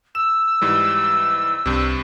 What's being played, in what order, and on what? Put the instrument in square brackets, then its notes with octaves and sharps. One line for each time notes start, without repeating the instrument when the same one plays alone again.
[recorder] E6 [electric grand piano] E7
[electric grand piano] G#2 E3 G3
[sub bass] C2 [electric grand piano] G2 C3